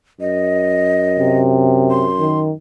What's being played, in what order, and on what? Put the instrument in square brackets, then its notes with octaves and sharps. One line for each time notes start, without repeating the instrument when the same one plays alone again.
[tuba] F#2 [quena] D#5
[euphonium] C3
[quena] C6
[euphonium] D#3